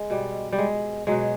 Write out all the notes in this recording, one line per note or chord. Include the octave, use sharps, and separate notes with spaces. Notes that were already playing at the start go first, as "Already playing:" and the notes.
Already playing: G#3
B2 G3
G3
G#3
B2 F#3 G#3